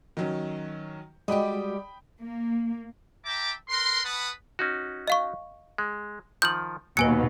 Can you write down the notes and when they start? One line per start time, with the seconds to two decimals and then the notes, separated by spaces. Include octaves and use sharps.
0.17 D#3 F#3 C#4
1.28 G3 G#3 F#4 G4 D#5 G5 B5 D#6
2.21 A#3
3.25 E5 G5 A5 A#5 D6
3.69 A#4 B4 C6
4.04 B4 F#5 A5 B5 D#6
4.59 C#4 D#4 F#4
5.08 D#5 F5 C#6
5.78 G#3
6.42 D#3 F3 G6 F#7
6.97 D#2 B2 F#3 B4 G#5 C#7